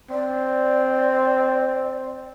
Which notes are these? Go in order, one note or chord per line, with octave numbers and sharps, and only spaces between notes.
C4 D5